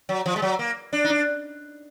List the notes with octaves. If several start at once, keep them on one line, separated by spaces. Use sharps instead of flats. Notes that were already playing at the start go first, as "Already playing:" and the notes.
F#3
F3
G#3
F#3
A#3
D4
D#4
D4